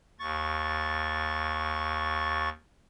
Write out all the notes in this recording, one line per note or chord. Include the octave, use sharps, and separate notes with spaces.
D#2 C#6 A6